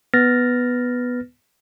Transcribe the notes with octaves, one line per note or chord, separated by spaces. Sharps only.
B3 B4 F6 A6 A#6